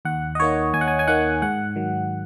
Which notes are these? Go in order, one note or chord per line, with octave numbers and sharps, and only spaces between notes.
D#2 F#5
D#5
D#3 A#3 D#4 C#5
D#2 G#5
F#5
G#5
G#5
D#3 A#3 D#4 F#5
G#2 F#5
D#3 F#3